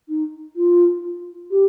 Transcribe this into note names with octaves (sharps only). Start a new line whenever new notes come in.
D#4
F4
G4